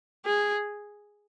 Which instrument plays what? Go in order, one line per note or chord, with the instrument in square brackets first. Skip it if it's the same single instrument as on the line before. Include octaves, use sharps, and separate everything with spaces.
[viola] G#4